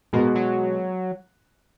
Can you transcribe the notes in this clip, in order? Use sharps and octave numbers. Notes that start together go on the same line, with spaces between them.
B2 G#3 A#3 B3 F#4
F#3